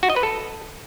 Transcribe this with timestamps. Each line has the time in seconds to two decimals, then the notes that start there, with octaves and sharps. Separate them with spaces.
0.03 F#4
0.10 D#5
0.16 B4
0.23 A4